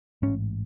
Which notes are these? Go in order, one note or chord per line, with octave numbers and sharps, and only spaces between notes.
A1 G#2 C#4